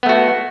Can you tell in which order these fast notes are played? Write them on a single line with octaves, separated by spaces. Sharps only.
B3 A3 F#4